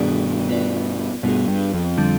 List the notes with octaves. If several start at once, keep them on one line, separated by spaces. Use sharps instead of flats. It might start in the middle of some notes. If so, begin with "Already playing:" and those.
Already playing: G2 B2 D#3 B3 D4 G#4 D5
B3 F4 B4 D5
G2 B2 B3 F4 G#4
G2
F2
D3 G3 D4